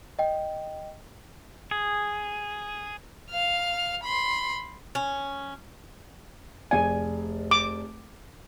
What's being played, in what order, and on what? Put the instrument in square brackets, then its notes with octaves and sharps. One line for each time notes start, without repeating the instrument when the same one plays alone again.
[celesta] D#5 G5
[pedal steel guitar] G#4
[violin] F5 F6
B5 C6
[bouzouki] C#4
[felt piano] F1 G#4 D5 [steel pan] G#5
[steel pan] D6